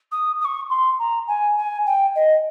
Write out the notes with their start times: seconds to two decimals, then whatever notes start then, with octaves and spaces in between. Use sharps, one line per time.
0.11 D#6
0.40 D#6
0.44 C#6
0.70 C6
0.99 A#5
1.27 G#5
1.57 G#5
1.86 G5
2.15 D#5